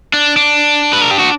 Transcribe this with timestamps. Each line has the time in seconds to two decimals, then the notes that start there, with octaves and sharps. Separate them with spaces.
0.14 D4
0.37 D4
0.93 B4
1.02 A#4
1.11 G4
1.19 F#4